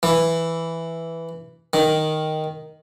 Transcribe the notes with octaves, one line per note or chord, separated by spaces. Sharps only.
E3
D#3